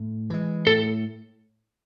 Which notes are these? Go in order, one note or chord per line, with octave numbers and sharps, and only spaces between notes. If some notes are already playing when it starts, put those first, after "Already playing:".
Already playing: A2
E3 G#3
A2 A4